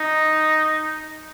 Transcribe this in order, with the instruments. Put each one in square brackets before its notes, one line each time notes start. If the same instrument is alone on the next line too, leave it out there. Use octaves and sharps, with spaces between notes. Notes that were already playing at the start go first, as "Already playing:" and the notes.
Already playing: [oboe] D#4